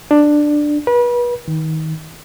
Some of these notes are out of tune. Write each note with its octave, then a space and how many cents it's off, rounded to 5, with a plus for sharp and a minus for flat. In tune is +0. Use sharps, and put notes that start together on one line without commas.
D4 +10
B4 -35
D#3 +25